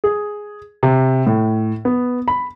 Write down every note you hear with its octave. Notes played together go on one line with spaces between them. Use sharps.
G#4
C3
A2
B3
B5